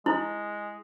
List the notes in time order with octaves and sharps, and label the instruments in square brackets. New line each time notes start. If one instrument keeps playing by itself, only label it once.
[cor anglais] G#3 [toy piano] E4